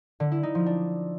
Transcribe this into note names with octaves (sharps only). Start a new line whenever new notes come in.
D3
E4
D#4
F3
D4